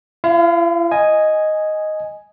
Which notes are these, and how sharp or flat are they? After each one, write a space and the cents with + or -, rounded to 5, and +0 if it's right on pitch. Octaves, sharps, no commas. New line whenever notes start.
E4 +45 F5 +0
D#5 +0 G#5 +0